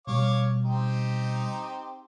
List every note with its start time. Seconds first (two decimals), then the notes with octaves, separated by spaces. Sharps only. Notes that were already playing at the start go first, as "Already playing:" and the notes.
0.07 B2 G3 C#5 F5 D6
0.64 C4 D#4 G4